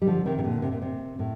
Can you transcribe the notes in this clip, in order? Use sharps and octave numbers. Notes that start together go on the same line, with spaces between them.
G3
D3 F3
C3 D#3
C3
A#2 D3
C3
A#2
C3
A2